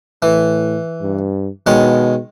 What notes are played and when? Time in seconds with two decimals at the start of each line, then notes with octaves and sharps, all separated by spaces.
0.22 A2 E3
1.02 G2
1.67 B2 D#3 G#3 C#5